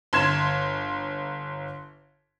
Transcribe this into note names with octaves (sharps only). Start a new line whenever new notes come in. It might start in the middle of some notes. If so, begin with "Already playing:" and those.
G1 C6 G#6 E7